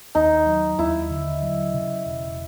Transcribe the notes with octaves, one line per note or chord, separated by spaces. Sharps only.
D#2 D#4
F#3
D#2 E4
D3
F#3
C#3
E1